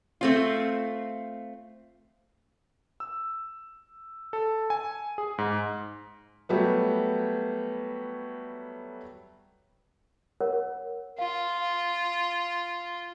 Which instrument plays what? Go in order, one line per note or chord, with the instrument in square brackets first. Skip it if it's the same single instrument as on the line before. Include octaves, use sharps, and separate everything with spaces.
[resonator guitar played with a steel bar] A3 C4 F4
[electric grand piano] E6
A4
G#5
G#4
G#2
[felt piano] F#3 G3 A3 B3
[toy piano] A#4 C#5 F#5
[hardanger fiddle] F4 [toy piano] F5